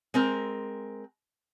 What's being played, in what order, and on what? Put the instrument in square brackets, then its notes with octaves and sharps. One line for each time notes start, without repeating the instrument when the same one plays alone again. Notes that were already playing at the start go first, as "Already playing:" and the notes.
[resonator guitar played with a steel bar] G#3 C4 A#4